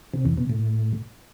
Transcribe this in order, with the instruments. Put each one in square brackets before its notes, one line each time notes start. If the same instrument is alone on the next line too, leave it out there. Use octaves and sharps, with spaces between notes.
[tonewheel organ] C3
E2
B2
A2